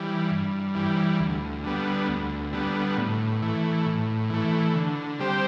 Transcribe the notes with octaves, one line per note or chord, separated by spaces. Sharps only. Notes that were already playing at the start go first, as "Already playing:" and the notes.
Already playing: E3 G3
G2
E3 G3
D2
D3 G3 B3
D2
D3 G3 B3
A2
E3 A3
A2
E3 A3
D3
G3 C4 G4 C5